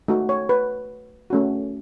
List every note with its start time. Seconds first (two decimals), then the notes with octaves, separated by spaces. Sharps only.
0.08 A3 D#4 F#4
0.29 C#5
0.49 B4
1.30 A3 C#4 F#4